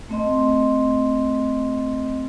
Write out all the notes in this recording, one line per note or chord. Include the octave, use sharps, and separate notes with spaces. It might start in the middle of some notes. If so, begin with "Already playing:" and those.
A3 C4 D#5 C6